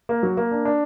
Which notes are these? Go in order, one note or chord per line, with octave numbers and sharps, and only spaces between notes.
A#3
F#3
A#3
D4
D4